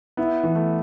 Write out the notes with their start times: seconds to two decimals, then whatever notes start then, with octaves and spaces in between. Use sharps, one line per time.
0.17 B3 E4
0.43 E3
0.55 A3